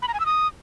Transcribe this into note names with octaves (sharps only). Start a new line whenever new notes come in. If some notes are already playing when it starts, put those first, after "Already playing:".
B5
A#5
G#5
E6
D#6